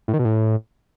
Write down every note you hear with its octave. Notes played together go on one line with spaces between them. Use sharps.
A2
D#3
B2
A2